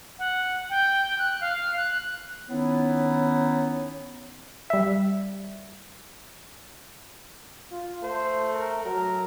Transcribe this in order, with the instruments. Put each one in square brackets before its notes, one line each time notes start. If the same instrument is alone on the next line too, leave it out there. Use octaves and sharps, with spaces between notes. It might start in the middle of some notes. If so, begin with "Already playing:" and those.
[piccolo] F#5
G5
F#6
F5
F#6
[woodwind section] D#3 B3 C#4 D#4 E4 C#5
[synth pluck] G3 E5
[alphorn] F4
[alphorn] A3 [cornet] C5
[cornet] A#4
[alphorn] F#3 [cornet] A#4